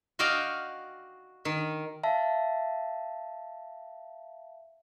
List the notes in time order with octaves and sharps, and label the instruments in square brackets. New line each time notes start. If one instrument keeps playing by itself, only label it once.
[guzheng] F#4 D5 D#5 F5 G5
D#3
[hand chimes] E5 F5 A5